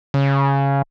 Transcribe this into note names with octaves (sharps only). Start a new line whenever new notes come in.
C#3